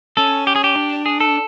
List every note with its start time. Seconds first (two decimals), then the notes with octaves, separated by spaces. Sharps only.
0.17 C#4 A4
0.47 G4
0.56 G#4
0.64 G4
0.75 D4
1.06 G#4
1.20 A4